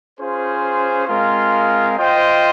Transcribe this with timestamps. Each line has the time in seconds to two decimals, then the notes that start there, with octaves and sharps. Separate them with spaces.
0.19 C#4 F4 G#4 C5
1.08 G#3 C4 F4 A#4 F5
1.97 F4 C5 D#5 G5